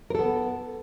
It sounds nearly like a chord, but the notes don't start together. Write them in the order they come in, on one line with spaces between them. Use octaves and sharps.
A#4 A4 B3